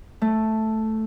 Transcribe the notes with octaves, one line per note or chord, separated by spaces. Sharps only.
A3